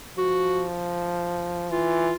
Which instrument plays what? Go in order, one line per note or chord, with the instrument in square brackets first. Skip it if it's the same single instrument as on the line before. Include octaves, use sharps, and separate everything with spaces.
[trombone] F3 [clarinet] F#4
[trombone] E3 [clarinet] F4